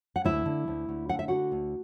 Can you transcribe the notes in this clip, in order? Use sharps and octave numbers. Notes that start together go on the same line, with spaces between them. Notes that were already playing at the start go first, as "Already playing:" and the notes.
F#5
D2 E4 E5
D3
D2
D2
D3 F#5
E5
D3 F#4 F#5
D2